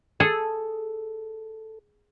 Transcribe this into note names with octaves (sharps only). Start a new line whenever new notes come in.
G#4 A4